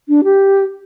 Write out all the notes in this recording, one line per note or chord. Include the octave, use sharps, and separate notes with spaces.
D4
G4